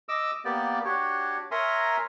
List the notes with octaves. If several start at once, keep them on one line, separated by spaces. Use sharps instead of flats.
D#5 D6 E6
A#3 B3 G4 D5
D4 F#4 G4 C#5
A#4 C#5 E5 G#5 A#5 C6